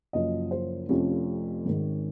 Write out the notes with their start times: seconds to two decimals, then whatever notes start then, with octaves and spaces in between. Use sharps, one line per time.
0.13 F#1 F#2 F3 D#5
0.51 C5
0.89 F1 F2 C3 F3 C#4
1.65 G#1 G#2 D#3